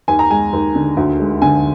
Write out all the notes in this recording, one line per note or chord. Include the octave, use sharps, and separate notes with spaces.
D#2 G#5
A#5
G#3 G#5
D#2
D3
D2
G#3
D3 G#5